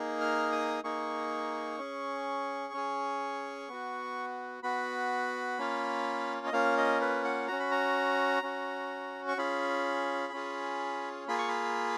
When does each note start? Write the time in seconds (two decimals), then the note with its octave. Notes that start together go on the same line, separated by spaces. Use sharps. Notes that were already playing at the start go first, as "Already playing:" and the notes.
Already playing: A#3 D#4 G#4
0.21 F6
0.52 D#6
0.84 A#3 D#4 G#4 C#6
1.78 C#4 G#4
2.73 C#4 G#4
3.69 B3 F#4
4.63 B3 F#4 B5
5.59 A#3 C#4 F4
6.46 D#5
6.53 A#3 C#4 F4 F5
6.77 D#5
7.01 B4
7.24 F#5
7.48 C#4 F#4 A#5
7.60 B5
7.71 A#5
8.43 C#4 F#4
9.28 C#6
9.37 C#4 F4 G#4 B5
10.33 C#4 F4 G#4
11.28 A#3 F4 G#4 B5
11.38 C#6
11.48 B5